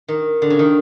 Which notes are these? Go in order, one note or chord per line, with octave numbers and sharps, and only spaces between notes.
D#3
D3
C#3
D#3